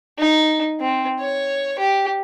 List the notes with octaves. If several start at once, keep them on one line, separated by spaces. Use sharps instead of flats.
D#4
C4
C#5
G4